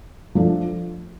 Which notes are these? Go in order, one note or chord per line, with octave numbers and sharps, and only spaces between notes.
F3 A3 D4